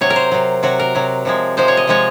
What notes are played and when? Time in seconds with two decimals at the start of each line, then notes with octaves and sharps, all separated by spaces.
0.01 C3 F#3 C#5
0.10 A#4
0.16 C5
0.31 C3 F#3
0.63 C3 F#3 F#4
0.80 A#4
0.95 C3 F#3
1.25 C3 F3 G#3
1.57 C3 F3 G#3 C5
1.68 C#5
1.77 D#5
1.87 C3 F3 G#3 C#5